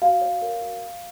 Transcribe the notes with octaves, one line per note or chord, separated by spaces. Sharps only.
F#4 F5
C#5
A#4
F#4